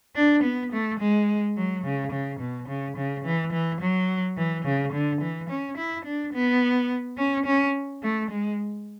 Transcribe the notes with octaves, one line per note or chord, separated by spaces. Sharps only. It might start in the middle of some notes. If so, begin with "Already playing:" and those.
D4
B3
A3
G#3
F#3
C#3
C#3
B2
C#3
C#3
E3
E3
F#3
E3
C#3
D3
E3
C#4
E4
D4
B3
C#4
C#4
A3
G#3